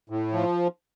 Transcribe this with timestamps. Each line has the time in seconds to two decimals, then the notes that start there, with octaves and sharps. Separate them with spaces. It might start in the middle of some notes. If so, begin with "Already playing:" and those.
0.10 A2
0.33 F3